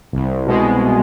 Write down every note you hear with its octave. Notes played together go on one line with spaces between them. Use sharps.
C2
B2 G#3